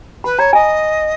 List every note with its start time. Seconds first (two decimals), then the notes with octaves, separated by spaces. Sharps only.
0.24 B4 B5
0.39 C#5 A#5
0.53 D#5 G#5